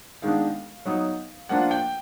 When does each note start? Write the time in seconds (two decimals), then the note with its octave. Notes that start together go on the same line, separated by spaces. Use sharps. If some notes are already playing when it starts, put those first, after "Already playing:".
0.22 D#3 G#3 B3 D4 F5
0.85 F#3 B3 D#4
1.49 F3 A#3 D4 F4 F#5
1.71 G5